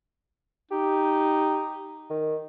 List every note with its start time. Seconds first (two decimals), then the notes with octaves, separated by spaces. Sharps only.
0.71 D#4 G4
2.10 D#3